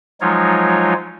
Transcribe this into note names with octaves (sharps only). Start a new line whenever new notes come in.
F3 F#3 G#3 D#4 F4 C#5